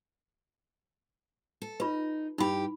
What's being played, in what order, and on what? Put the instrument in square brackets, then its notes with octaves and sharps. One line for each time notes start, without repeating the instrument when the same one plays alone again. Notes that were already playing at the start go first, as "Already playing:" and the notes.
[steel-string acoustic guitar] A4
[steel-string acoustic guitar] D#4 [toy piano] F4 B4
[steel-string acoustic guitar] G2 G4 [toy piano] D#4 E4 B5